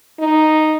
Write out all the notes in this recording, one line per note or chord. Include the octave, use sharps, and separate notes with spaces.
D#4